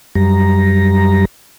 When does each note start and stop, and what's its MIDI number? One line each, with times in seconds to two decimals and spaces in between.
0.15 1.25 42
0.15 1.25 55
0.15 1.25 82